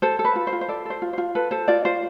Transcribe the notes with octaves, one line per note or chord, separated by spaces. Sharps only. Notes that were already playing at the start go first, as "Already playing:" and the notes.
A4 C5
A4
B4
F4
C5
F4
C5
A4 D5
A4 C5
F4
F4 C5
A4 B4
A4 C5
F4 D5
F4 C5